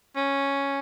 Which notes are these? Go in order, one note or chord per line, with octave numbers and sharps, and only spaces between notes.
C#4